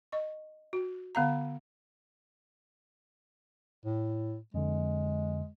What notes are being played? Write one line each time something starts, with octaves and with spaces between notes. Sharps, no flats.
D#5 C#6
F#4
D3 B3 F5 A#5
A2
F2 D3 G#3